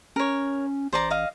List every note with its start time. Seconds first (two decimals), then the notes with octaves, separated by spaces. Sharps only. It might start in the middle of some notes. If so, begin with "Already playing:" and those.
0.16 C#4 A#4 C#5
0.93 A1 C5 D5 A#5
1.10 D#5 F5